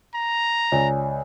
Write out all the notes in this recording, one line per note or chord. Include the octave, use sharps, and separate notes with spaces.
A#5
C#2 C#5 D5 G#5